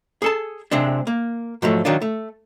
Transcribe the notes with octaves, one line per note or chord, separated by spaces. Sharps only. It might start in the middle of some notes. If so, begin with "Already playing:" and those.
G#4 A4 A5
C3 G#3 C4 D4
A#3
G#2 F3 F#3 A3
D#3 F#3 D4 F4
A3